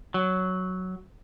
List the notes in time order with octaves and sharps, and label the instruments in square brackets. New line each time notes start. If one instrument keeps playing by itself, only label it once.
[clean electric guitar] F#3